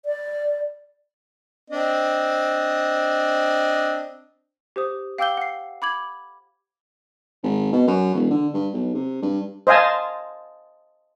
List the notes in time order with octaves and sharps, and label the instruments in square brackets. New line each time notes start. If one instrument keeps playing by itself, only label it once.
[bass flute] D5
[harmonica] C4 D4 D#5
[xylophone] G4 C5 D#6
F5 G5 D6 E6 G6 G7
F#5 C7
B5 D6 G#6 F#7
[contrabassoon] G#1
B2
F#2
E1
D3
G2
B1
C3
G2
[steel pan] C5 D#5 F5 G#5 A5